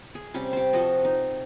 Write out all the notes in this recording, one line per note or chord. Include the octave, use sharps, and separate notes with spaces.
G#4
C3 G3 C#4
G4 C5
F3 F#4 A4 D#5
D#4